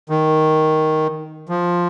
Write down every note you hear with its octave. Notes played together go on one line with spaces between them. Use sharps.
D#3
F3